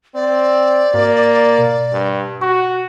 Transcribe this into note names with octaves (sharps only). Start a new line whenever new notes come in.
C4 D5
G#2 A#3
B2
G2
F#4 C#6